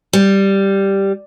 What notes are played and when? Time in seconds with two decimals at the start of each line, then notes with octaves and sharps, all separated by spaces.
0.13 G3